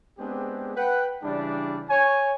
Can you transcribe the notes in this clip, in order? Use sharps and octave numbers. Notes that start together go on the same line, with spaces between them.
G#3 B3 C4 D4 G4 G#4
B4 F#5 G5
C#3 E3 G3 D4
C#5 G#5